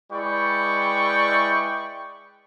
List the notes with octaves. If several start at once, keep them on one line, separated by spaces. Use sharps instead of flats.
G#3 E4 B4 D5 G5 C#6